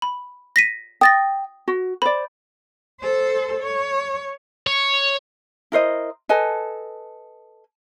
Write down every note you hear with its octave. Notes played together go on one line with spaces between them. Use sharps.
B5
A#6 B6 D#7
G5 D#6 A6 A#6
F#4
C5 D5 B5
A4 C5
C#5
C#5
E4 A#4 C5 D#5
A4 B4 D#5 G#5